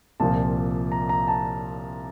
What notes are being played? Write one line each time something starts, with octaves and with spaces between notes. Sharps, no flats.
C2 A#2 F3 A5
A#5
A#5
A5